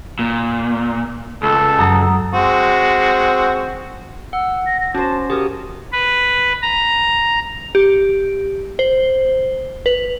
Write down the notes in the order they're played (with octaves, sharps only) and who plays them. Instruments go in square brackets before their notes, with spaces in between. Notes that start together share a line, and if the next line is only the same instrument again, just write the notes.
[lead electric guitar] A#2
[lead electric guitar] C#2 [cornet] A4
[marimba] F#2 [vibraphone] F#3 A#5 D#6
[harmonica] G#3 C4 F#4
[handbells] F#5 [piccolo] E6
[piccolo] A#6
A#6
[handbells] C#4 [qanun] F#4 C5 [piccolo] A5
[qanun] C#3 A#4 C#6 [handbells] G4 [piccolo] D#6
[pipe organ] B4
A#5
[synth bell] G4
C5
B4